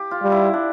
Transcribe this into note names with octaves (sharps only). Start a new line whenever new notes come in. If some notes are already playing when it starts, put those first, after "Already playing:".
Already playing: G4
F4
G3
E4
D4